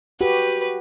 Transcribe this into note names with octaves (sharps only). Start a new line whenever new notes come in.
F#4 G4 B4